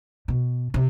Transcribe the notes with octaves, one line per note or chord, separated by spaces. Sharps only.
B2
C3